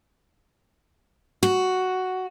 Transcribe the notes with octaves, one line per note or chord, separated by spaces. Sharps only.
F#4